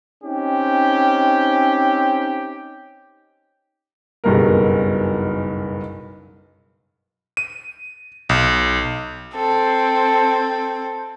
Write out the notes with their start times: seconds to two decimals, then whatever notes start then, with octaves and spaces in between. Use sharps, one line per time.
0.23 C4 C#4 D#4 G4
4.24 F#1 B1 G2 B3 A#4
7.37 D#7
8.29 B1
9.34 C4 A4